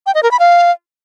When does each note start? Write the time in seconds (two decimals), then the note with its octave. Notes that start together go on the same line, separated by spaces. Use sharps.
0.06 G5
0.15 D#5
0.23 A#4
0.31 B5
0.39 F5